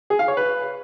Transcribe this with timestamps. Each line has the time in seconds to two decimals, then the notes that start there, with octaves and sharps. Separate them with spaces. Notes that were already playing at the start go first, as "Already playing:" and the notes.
0.10 G#4
0.19 F5
0.28 C#5
0.37 B4